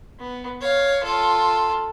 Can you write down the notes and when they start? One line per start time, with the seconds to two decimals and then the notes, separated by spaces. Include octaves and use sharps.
0.19 B3
0.61 C#5 F5
1.03 F4 A4